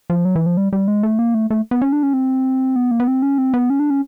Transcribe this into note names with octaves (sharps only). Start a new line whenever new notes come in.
F3
F#3
E3
F3
G3
G3
G#3
A3
A#3
A3
A3
B3
C#4
D4
C#4
C4
B3
A#3
B3
C4
C#4
C4
B3
C#4
D4
C#4